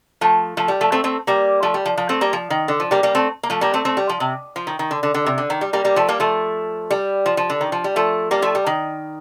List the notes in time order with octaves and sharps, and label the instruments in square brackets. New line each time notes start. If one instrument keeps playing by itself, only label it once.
[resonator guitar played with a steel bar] F3 A3
F3 A3
G3
F3 A3
A3 C4
A3 C4
G3 A#3
F3 A3
G3
F3
F3
A3 C4
G3 A#3
F3
D#3
D3
F3
G3 A#3
G3 A#3
A3 C4
A#3
F3 A3
G3 A#3
A3 C4
A3 C4
G3
F3
C3
F3
D#3
D#3
D3
D3
D3
C3
D3
D#3
G3
G3 A#3
G3 A#3
F3 A3
G3 A#3
F3 A3
G3
F3
F3
D3
D#3
F3
G3
F3 A3
G3 A#3
F3 A3
G3
D#3